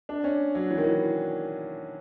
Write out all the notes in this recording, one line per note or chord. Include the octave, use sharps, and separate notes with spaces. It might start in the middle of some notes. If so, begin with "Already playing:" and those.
D4
C#4
F#3
E3
D#3
E3